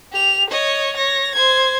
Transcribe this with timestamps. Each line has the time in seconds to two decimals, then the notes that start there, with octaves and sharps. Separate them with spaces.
0.12 G4 F7
0.50 C#5 D#5
0.97 C#5 A#6
1.35 C5 G#6